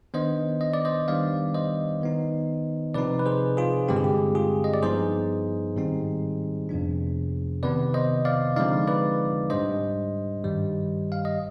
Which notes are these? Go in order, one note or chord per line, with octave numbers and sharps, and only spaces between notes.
D#3 B3 D4 C5 D#5
D#5
D5
C5 D#5
D#3 G3 B3 D4 D5 F5
C5 D#5
D#3 B3 D#4
C3 F3 C4 D#4 B4 D5
B4
G#4 C5
F4 G#4
G2 D3 G#3 C4 G4
G#4
G4
F4 G#4
D#5
D5
G2 F3 B3 D#4 G#4 C5
G#2 D#3 G3 C4 D#4
F2 C3 F3 B3 D4
C3 D#3 B3 B4 D5
C5 D#5
D5 F5
D3 F3 G#3 C4 D#4 D5 F5
B4 D5
G#2 G3 D4 C5 D#5
G2 D#3 G3
F5
D#5